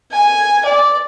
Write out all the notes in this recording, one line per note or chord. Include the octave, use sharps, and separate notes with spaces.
G#5
D5